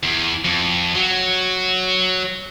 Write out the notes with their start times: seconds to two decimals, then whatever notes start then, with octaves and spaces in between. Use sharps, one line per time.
0.03 E2
0.45 F2
0.95 F#3